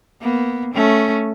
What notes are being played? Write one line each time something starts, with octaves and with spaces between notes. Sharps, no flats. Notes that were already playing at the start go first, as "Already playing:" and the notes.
A#3 B3
A3 C#4